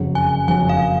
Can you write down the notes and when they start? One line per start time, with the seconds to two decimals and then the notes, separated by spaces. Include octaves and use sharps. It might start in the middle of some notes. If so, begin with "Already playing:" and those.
Already playing: F#1 F2 C#3 F#3
0.15 G#5
0.48 F#1 F2 C#3 F#3 G#5
0.69 F5